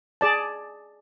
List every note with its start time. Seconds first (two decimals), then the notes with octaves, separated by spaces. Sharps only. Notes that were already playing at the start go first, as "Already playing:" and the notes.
0.21 G#4 D5 A5